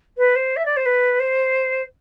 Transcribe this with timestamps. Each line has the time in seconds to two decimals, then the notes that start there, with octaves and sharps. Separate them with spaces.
0.18 B4
0.36 C5
0.56 E5
0.65 D5
0.77 C5
0.86 B4
1.20 C5